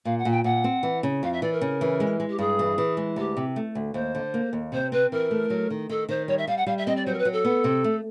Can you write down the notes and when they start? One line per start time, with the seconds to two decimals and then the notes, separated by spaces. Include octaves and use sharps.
0.05 A#2 F5
0.18 F#5
0.25 A#2
0.31 G5
0.44 A#2 F#5
0.64 C4
0.83 E3
1.03 C#3
1.23 F2 F5
1.33 E5
1.42 E3 D5
1.52 A#4
1.61 C#3
1.81 E3
2.00 G#3
2.20 G#3
2.29 G4
2.39 G2 G#4
2.59 E3
2.78 E3
2.97 G#3
3.16 D2 G4
3.37 C3
3.56 A3
3.75 D2
3.94 D#2 C5
4.15 D3
4.34 A#3
4.53 D#2
4.72 C3 C5
4.92 C4 B4
5.12 E3 A#4
5.31 A3
5.50 F#3
5.70 D#3
5.89 D#3 A4
6.09 D#3 C5
6.28 G3 C#5
6.38 E5
6.47 G3 F5
6.57 F#5
6.67 G3 F5
6.77 E5
6.86 C4 D#5
6.96 D5
7.06 F#3 C5
7.14 A#4
7.18 B4
7.25 F#3
7.32 A4
7.45 B3
7.64 C3
7.84 A3